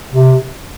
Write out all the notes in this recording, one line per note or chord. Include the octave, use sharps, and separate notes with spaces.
C3